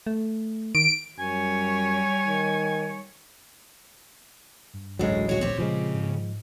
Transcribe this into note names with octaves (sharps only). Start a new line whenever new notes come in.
A3
D#3 D7
F#2 G3 C#5 G#5
D#3
G2
A1 D2 A2 F#3 G#3
A#2 G#3 F#4 C#5
C4 G4
C#3 F3 G#3
G#2